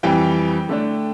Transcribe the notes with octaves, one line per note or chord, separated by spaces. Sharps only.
F2 E3 G3 G5
D3 A3 D4